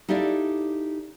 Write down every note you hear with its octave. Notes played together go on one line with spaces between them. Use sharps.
D#4 E4 G4 A4 D5 F5